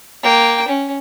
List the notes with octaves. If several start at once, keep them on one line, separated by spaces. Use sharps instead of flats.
A#3 G5
C#4